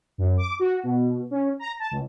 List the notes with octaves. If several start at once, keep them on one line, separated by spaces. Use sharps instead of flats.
F#2
D6
F#4
B2
C#4
A#5
A5
C#2